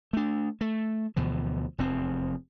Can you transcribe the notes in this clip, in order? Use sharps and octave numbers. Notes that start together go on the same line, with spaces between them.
A3 D4
A3
D2 B2 E3 F3
F1 E2 C4